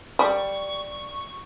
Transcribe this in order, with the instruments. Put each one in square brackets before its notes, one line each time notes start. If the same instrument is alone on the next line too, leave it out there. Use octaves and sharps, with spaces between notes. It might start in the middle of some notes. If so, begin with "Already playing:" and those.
[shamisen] G3 [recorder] C#6